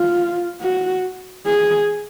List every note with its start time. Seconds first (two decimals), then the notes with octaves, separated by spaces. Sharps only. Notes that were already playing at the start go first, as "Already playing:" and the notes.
Already playing: F4
0.61 F#4
1.46 G#4